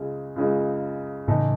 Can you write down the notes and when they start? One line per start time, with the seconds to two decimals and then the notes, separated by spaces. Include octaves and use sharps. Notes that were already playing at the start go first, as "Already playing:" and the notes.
Already playing: C#2 C#3 G#3
0.36 C#2 C#3 G#3
1.28 A2 C#3 E3 A3 D#4